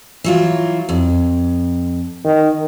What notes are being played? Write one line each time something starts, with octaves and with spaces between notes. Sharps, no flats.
E3 F#3 F4
F2
D#3